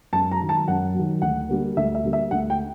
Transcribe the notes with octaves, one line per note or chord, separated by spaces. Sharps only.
F#2 A5
A#5
D#3 F#3
A5
F#2 F#5
D#3 F#3
D2 F#5
D3 G3 A#3
D2 E5
E5
D3 G3 A#3
E5
D2 F#5
G5